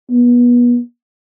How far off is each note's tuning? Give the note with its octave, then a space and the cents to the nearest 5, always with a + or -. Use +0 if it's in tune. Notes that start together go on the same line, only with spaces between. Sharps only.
B3 -30